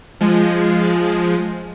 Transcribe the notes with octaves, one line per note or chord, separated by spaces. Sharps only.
F3 G#3